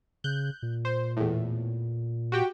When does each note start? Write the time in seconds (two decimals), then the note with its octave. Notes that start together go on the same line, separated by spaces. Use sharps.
0.24 C#3 F#6 G6
0.62 A#2
0.85 C5
1.17 E2 A2
2.32 F#4 G4 G5